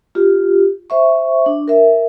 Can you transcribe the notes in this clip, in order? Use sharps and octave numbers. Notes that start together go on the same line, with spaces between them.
F4 G4
C5 E5 C#6
D4
A#4 E5